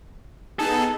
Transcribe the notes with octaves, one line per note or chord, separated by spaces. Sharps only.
B3 D#4 G#4 A4